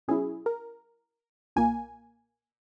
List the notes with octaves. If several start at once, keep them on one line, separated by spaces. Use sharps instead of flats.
B2 F#3 C#4 E4 G#4
A#4
B1 A#2 A#3 G#5